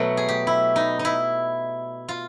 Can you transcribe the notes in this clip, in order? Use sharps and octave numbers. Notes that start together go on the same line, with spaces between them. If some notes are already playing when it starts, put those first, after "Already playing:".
Already playing: B2 F#3 A3
G#4
G4
E4
D#4
D#4
E4
F4